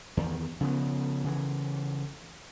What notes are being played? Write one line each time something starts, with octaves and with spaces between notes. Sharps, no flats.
E2 D#3
C#3 F3 F#3 B3
C#3 E3